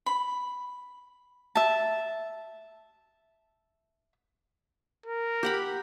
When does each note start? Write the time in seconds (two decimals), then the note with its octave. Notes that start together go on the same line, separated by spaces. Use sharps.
0.06 B5
1.55 E5 A5
5.06 A#4
5.43 G4 F#5 B5